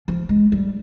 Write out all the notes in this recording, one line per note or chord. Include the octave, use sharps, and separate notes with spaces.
F3
G#3
G3